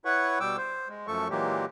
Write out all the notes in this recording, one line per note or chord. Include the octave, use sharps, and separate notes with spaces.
E4 B4 C#5 F#5 C#6
B2 G3 G5 D6 E6
C5
G#3
F#2 F3 A3 A4 C#6
A#2 E3 F#3 G#3 A#3 G4